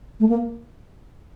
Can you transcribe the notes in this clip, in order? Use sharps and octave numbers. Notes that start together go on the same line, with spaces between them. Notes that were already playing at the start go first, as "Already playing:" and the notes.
A3
A#3